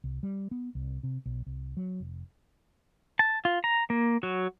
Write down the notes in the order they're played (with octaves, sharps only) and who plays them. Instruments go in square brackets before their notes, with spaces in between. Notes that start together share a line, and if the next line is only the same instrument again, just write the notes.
[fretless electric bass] C2
G3
B3
C2
C3
B1
C2
F#3
F1
[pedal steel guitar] A5
F4
A#5
A#3
F#3 F#4